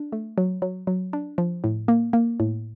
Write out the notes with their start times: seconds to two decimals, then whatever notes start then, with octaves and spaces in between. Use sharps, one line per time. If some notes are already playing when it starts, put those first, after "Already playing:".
Already playing: D4
0.12 A3
0.38 F#3
0.62 F#3
0.87 F#3
1.13 D4
1.38 F3
1.64 A2
1.88 A#3
2.13 A#3
2.40 A2